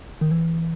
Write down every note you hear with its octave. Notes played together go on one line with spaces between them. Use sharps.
D#3
E3